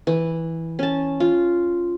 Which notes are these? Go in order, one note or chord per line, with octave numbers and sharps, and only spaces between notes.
E3
C#4 A5
F4